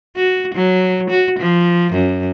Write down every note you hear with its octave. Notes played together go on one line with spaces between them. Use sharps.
F#4
F#3
F#4
F3
F#2